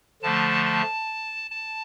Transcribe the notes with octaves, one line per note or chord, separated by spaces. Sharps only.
D3 F3 A3 A5
A5
A5